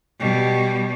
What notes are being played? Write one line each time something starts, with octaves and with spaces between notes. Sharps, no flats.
B2 G3